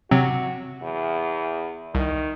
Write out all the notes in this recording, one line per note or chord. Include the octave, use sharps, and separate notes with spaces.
C3 F#3 C4 F#4
E2
C2 D#3